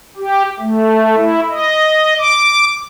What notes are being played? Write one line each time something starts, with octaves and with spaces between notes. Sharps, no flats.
G4
A3
E4
D#5
D6